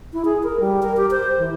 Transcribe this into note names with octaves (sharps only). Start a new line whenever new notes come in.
E4
G#4
A#4
G3
A#4
G4
C5
E3